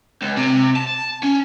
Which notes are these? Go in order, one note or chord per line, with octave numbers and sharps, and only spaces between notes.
C#2
C3
A5
C#4